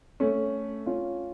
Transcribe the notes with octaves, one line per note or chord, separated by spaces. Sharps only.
A3 C#4
C#4 F4